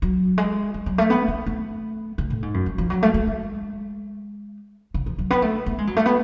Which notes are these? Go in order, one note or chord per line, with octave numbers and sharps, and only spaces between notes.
F#3
G#3
F#3
F#3
A3
B3
B3
A3
C#3
A2
G#2
F#2
F3
F3
F#3
A3
A3
G#3
C#3
F3
F#3
B3
A3
B3
G#3
F#3
A3
B3